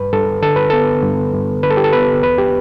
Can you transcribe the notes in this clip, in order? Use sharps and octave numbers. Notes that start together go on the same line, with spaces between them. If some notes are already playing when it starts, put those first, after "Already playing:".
Already playing: G2 B4
G2 A4
D3 A4
B4
B3 A4
G2
G2
D3 B4
A4
G4
A4
B3 B4
E2 B4
G4